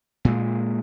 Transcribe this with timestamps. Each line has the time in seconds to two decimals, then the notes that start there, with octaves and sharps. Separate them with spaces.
0.25 A#2 G#3